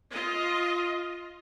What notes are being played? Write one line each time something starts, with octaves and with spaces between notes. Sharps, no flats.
F4 D#5